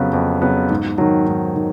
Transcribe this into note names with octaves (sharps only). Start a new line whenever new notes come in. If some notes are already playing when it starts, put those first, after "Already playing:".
Already playing: F2 C#3 F#3 B3
F2
C#3 F#3 B3
G#2
D#3 F#3
G#2
D#3